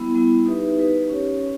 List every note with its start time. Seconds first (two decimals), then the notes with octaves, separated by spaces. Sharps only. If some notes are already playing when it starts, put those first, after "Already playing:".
Already playing: G3 B3 E4
0.15 G3 B3 E4
0.46 D#4 G4 B4 E5
0.78 D#4 G4 B4 E5
1.09 C#4 G4 C#5
1.40 C#4 G4 C#5